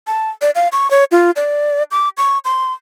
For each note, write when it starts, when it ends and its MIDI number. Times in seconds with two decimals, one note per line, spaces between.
0.07 0.30 81
0.42 0.51 74
0.55 0.68 77
0.72 0.90 85
0.91 1.04 73
1.12 1.31 65
1.36 1.83 74
1.91 2.09 86
2.17 2.38 85
2.45 2.73 84